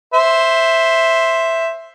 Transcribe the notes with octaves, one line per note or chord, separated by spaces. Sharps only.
C5 E5